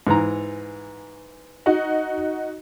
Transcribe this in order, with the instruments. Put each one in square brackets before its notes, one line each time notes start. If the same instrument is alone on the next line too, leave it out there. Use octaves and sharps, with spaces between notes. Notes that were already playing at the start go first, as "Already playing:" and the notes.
[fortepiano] G#2 E3 A#5
[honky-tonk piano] D#4 F#4